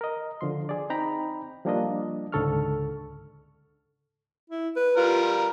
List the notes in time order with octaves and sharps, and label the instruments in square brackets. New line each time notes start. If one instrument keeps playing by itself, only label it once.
[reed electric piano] A#4 D#5
D3 F3 C6
G#4 D5
C4 D#4 G5 A#5 B5
F3 G3 A#3 D4 F4 D#5
C#2 G#2 D3 A4 C#6 F6
[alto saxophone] E4
B4
[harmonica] G3 A#4 [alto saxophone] F4